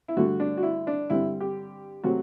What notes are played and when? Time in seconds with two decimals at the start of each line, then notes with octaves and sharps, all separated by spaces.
0.08 E4
0.17 G2 D3 A3 F#4
0.40 D4
0.57 F#4
0.63 E4
0.87 D4
1.10 G2 D3 G3 C4 E4
1.40 G4
2.04 C3 F#3 A3 C4 F#4